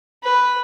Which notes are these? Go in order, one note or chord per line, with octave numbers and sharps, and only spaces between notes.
B4